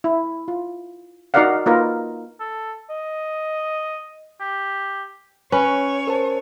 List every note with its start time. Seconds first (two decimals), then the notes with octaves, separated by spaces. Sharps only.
0.04 E4
0.48 F4
1.34 D#4 F#4 A#4 D5 F5 F#5
1.66 A#3 D#4 F4 A#4 B4
2.40 A4
2.90 D#5
4.40 G4
5.52 C#4 B4 C#5
6.07 A#4 C5 A5